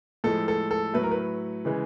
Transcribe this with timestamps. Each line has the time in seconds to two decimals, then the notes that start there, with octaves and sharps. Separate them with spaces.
0.24 A2 F3 G#3 A4
0.48 A4
0.71 A4
0.94 A2 F#3 A3 B4
1.03 A#4
1.11 B4
1.65 C#3 E3 G#3